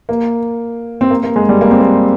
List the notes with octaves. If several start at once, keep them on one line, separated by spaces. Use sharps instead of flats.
A#3
C4
A#3
A#3
G#3
G3
A#3
C4
A#3